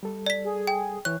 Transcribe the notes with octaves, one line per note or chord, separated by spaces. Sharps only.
G3 A4
D5 B6
G#4
G5
E3 C#5 F#6